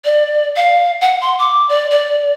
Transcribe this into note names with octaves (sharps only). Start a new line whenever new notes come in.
D5
F5
F#5
C6
D6
D5
D5